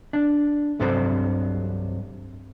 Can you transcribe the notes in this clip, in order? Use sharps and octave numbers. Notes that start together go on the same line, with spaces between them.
D4
C2 G2 C3 F#3 A4 C5